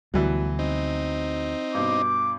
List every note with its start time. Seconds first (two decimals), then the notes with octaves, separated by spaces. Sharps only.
0.14 D2 B2 E3 F#3 G3
0.59 C4 D#4
1.75 G2 B2 D6